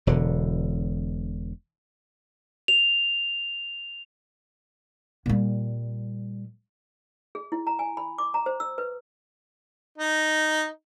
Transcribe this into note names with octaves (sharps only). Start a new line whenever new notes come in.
E1 B2 D3
F7
A#2 G3
G#4
E4
A#5
G#5
B5
D6
A#5
C5
E6
B4
D#4